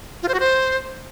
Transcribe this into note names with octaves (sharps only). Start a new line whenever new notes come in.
F4
C5
F#4
C5